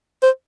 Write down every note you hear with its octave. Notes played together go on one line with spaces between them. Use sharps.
C5